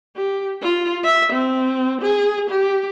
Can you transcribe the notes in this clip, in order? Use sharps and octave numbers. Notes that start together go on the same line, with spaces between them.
G4
F4
E5
C4
G#4
G4